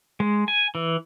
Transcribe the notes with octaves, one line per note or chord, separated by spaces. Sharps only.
G#3
G#5
E3